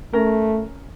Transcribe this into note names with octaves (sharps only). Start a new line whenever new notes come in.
A3 C#4 A#4